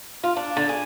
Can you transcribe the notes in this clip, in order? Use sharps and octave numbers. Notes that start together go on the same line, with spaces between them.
F4
D4
D3
G#4